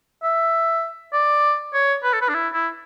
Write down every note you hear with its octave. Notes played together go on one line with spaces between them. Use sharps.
E5
D5
C#5
B4
A4
B4
D4
E4
E4